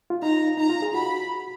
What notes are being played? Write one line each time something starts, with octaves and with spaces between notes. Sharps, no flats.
F4
D#4 A#5
D#4 A#5
F4
G#4
F#4 B5